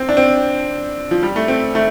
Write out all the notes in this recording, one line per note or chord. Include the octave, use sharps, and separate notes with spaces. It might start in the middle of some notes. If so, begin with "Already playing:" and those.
Already playing: C4
D4
C4
F3
G3
A3
C4
A3